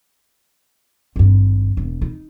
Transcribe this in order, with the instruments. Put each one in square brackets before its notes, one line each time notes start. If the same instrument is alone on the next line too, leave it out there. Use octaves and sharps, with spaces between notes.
[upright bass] G#1 G2
E1
D#4